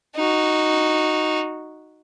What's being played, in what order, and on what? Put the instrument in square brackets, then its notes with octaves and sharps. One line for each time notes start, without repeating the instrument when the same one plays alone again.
[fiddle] D#4 F#4